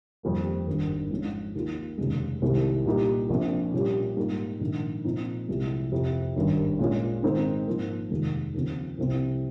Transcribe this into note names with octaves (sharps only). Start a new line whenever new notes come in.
F2 D#3 G3 A#3
G#1 G2 D#3 G3
G#2 F3 G#3 C#4
D#2 D#3 A#3 F4
F1 D#2 C#3 G#3
C2 C3 D#3 G#3 C4
A#2 G3 A#3 D#4 G4
A#1 A#2 F3 C4
A#2 G3 C#4 G4
G#2 G3 A#3 D#4
A#1 G#2 D#3
A#2 F3 C4 D#4
C2 C3 F3 G#3
F2 C3 F3
G#1 G2 D#3 G3 C#4
A#2 G#3 C#4 F4
G#2 D#3 G#3 C4 D#4
G#2 F3 A#3
F1 D#2 D#3 G#3
D#2 C#3 F3 C4
C2 C3 F3 C4 F4